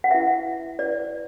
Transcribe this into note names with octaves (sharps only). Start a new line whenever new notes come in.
F#5
E4 B4 E5
E4 B4 D5